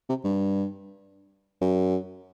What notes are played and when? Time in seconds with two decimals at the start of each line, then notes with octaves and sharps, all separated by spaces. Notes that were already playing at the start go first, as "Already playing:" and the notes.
0.09 C3
0.24 G2
1.61 F#2